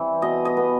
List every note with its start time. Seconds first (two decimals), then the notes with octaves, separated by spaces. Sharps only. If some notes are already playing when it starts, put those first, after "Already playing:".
Already playing: E3 G3 C4
0.22 B2 D#5
0.45 D#5
0.57 B3